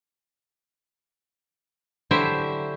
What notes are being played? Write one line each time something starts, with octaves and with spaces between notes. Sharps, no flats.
D3 F#3 E4 G4 C5 E5